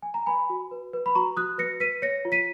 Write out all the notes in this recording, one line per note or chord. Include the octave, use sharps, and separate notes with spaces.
G#5
A#5
B4 G#5 B5
F#4
B4
B4
B5
F#4 A#5 C#6
F#4 D#6 F#6
B4 A#6 C#7
B4 B6 D#7
C#5 A#6 C#7
F4
B6 D#7